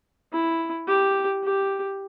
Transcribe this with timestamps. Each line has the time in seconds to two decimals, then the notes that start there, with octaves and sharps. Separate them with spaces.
0.33 E4
0.88 G4
1.44 G4